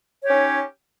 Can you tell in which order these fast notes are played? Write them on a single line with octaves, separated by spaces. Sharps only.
C#5 G4 C#4 D#4